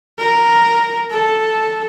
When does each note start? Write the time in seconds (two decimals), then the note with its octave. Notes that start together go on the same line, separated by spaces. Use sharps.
0.19 A#4
1.11 A4